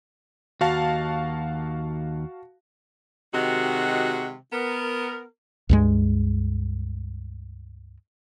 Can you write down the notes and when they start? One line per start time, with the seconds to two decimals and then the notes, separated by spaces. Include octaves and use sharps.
0.61 D#2 F#4 F5 A5
3.34 C3 D#3 G#3 F#4
4.53 B3 A#4
5.69 C#2 G2 G#3